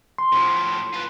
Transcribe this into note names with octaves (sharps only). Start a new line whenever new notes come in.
C6
A2 F3
F4 B4